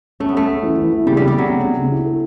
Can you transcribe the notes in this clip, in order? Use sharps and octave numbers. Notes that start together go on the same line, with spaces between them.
A3 C#4
B3
A3 C#4
C#4
E3
E3
E3
C#3 G3
C#3 G3
G3
C#3 F#3
C#3
C#3
C#3
E4
A4